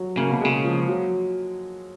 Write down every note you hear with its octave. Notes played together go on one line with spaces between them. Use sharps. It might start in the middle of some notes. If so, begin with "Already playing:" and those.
Already playing: F#3
C#3 A#3
B2
C#3 G#3
F3
F#3